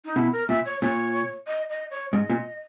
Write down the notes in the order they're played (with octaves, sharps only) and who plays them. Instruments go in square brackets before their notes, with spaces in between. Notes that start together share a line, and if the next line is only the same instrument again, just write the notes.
[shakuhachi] D#4
[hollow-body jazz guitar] B2 [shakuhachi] E4
[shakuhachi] A#4
[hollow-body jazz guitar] A#2 [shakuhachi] E5
[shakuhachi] C#5
[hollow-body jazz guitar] A#2 [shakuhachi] C#5
[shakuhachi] D#5
D#5
C#5
[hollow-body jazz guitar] G#2 [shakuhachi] D#5
[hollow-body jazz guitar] A#2